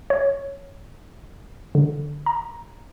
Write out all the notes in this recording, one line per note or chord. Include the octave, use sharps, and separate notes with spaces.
C#5
D3
A#5